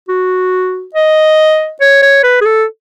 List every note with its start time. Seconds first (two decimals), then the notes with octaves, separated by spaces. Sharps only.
0.09 F#4
0.95 D#5
1.81 C#5
2.02 C#5
2.24 B4
2.41 G#4
2.45 A4